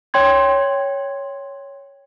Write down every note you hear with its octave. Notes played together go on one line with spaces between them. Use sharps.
C#5 G5 C6 G#6